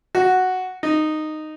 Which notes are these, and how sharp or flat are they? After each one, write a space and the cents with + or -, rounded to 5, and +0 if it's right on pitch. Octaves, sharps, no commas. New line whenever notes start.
F#4 +0
D#4 -10